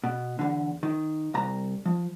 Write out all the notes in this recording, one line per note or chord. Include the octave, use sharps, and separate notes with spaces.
B2
E2 D3
D#3
C2 A#5
F3